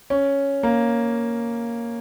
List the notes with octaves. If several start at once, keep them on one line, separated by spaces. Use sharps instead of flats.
C#4
A#3